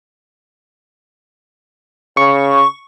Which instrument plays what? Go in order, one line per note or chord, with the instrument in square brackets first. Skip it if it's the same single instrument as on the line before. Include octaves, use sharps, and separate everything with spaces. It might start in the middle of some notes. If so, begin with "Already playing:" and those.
[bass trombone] C#3 [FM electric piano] C#6